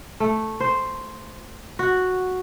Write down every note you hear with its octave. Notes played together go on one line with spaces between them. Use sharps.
A3
C5
F#4